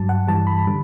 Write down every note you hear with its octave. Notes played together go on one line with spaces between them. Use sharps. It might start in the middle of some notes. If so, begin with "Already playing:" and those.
Already playing: G2 F#3 A5
F#5
G2 E3 G3 A5
B5
D3 G3